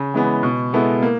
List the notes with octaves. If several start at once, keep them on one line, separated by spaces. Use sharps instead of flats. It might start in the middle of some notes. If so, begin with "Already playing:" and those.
Already playing: C#3
E3 G#3 B3
B2
G#3 B3 E4 A4
A#3